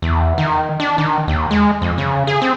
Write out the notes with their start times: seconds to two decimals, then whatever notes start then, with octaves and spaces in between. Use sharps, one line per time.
0.02 E2
0.38 D#3
0.80 D4
0.98 D#3
1.28 D#2
1.51 G#3
1.82 F2
1.98 C#3
2.27 G#4
2.42 C4